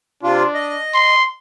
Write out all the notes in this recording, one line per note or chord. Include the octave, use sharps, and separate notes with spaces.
C3 D4 F4
D#5
C6